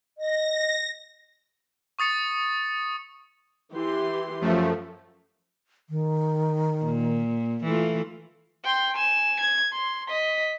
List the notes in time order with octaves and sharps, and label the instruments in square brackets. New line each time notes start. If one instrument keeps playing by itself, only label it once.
[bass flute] D#5 [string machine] A#6
[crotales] C#6 D#6 A6 C#7
[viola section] E3 G4 C6
[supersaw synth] F#2 F3 A3
[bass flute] D#3
[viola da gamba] A#2
E3 A3 F4
[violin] G5 C6
G#5 E7
G#6
C6
D#5 B6